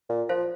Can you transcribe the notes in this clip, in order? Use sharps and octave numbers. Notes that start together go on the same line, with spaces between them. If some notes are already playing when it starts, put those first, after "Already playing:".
A#2
F3 C5 F5